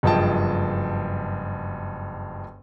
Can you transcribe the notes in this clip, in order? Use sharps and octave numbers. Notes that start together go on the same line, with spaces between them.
F#1 G2 F3 D#5 G5 A5